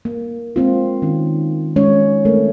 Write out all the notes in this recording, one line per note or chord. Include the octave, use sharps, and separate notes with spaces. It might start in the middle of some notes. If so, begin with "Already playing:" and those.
A#3
G#3 A#3 C4 F4
D#3 C#4
G#3 C#4 C#5
A3 C4 A4 A#4